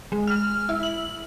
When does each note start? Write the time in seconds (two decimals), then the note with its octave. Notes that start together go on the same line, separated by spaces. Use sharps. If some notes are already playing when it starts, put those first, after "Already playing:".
0.12 G#3
0.27 F6
0.69 E4
0.83 F#7